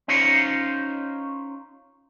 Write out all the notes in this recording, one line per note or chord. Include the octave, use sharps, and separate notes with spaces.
C#4 D#4 F4 C5 C#5